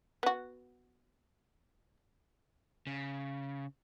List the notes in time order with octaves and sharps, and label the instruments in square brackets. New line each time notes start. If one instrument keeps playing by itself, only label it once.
[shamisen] B3 F#4
[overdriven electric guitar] C#3